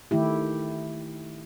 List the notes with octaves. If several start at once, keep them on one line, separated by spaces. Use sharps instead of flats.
D#3 A3 E4 G4